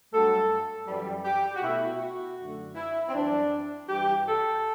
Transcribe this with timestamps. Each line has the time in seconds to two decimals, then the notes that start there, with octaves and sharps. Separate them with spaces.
0.11 G2 F#3 A3 A4
0.87 F#2 E3 G3
1.24 G4
1.55 F#4
1.62 B2 A3 E4
1.81 F#4
2.00 F#4
2.37 F#2 D3 A3
2.75 E4
3.08 C4
3.13 F#2 E3 G3 D4
3.88 G2 E3 G3 G4
4.26 A4